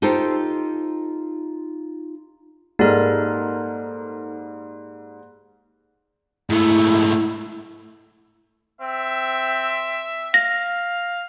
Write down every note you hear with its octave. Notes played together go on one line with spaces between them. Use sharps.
D#4 F4 G4 A4 C5 G5
G#2 G3 A#3 D#4 A4 F6
G#2 A3 E4
C4 E5
F5 A#6